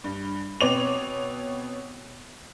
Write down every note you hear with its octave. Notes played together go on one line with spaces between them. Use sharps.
G2
B2 C4 B4 C#5 D6 F7